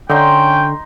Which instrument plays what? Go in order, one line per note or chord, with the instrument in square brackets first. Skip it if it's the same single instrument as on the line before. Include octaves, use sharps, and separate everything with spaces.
[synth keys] D3 [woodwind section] C#4 G5 [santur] D#4 C6